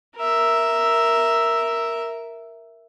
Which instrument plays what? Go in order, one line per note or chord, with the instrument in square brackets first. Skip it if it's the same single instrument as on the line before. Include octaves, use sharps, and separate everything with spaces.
[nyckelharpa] A#4 E5